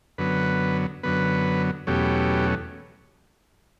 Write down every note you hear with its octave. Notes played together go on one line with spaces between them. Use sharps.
F#2 D3 F#3 B3 B4
F#2 D3 F#3 B3 B4
E2 B2 F#3 A3 C#4 G4